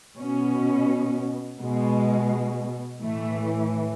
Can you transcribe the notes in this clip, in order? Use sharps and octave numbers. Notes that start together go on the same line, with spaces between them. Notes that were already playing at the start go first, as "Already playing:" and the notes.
B2 C#4
B2 G#3
A2 E3 A3